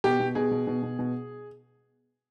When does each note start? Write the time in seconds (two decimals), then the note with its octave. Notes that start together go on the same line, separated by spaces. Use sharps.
0.04 B2 G4
0.20 B2
0.35 B2 G#4
0.51 B2
0.67 B2
0.83 B2
0.99 B2